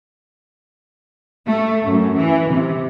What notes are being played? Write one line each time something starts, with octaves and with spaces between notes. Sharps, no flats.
A3
F#2
E3
C3